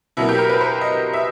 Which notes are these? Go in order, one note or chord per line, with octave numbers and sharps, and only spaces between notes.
B2 F#3 A#3 E4
G4
A#4
B4
C5
D#5
E5